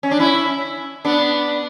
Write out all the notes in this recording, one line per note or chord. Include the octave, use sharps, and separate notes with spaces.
C#4
D4
C#4 E4
B3 D4